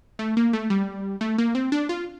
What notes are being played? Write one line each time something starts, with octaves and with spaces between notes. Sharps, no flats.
A3
A#3
A3
G3
A3
A#3
C4
D4
F4